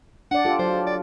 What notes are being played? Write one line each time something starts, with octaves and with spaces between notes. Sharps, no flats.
D4 D5 F#5
F4 G4 A4
F#3 C5
D5